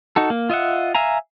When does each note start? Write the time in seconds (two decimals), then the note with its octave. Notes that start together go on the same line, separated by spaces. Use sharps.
0.16 D#4 F#4 A4
0.30 A#3
0.50 F4 D#5 E5 F#5
0.95 E5 F5 G#5 A#5